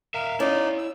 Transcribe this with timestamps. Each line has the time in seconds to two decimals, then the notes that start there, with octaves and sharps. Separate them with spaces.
0.14 A#4 E5 F5
0.40 C#4 D#4 E4 D5 F5
0.78 E6